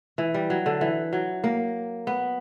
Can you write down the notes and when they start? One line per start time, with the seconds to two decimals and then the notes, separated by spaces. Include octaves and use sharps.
0.18 E3
0.34 G3
0.50 F#3
0.66 D3
0.81 E3
1.13 F#3
1.44 A#3
2.07 B3